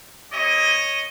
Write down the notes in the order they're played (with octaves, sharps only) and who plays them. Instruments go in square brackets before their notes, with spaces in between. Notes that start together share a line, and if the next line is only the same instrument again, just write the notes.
[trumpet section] C4 E4 G4 C#5 D#5